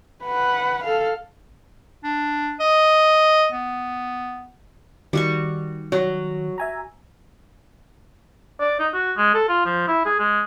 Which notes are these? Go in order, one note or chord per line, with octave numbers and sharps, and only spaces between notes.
B4 F#5
A4 F5
D4
D#5
B3
D#3 G3 F#4 C#6
F#3
E5 G#5 A#5
D5
D#4
F#4
G#3
A4
F4
F3
E4
G#4
G#3